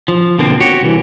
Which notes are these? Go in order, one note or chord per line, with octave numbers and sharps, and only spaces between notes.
F3
B2 D3 A#3 C4
F#4 G4 C#5
C2 E3